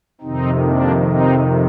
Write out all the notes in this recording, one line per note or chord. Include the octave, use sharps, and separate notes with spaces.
F2 C3 D#3 C4 D#4
A#3 D4
C4 D#4